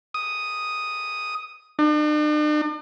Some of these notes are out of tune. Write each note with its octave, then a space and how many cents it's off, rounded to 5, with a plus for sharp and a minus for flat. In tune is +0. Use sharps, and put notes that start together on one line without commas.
D#6 +0
D4 +45